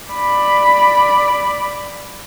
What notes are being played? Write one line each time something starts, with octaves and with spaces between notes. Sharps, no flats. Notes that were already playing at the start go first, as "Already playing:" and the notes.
D5 B5